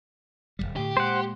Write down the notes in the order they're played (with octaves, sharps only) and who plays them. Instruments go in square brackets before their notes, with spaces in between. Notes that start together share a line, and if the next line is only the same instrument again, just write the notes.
[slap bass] D1 C2 G3
[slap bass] A2 D3 [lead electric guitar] G4
[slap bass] A#2 G#3 [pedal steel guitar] C5 F#5